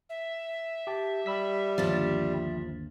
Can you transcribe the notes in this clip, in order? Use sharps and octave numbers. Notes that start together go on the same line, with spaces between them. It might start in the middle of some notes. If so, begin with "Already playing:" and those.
E5
G4 A5
G3 B5 E6 B6
G1 D#2 F3 D4 A6